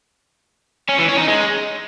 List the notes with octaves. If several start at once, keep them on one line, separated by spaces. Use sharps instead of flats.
C#4
E3
C#4
D#4
G#3